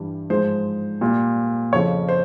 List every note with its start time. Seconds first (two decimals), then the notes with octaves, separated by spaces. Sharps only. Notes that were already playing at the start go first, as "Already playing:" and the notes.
Already playing: G2 E3 G3
0.30 G#2 F3 G#3 C5
1.01 A#2 G3
1.73 F2 C#3 F3 C#5
2.09 C5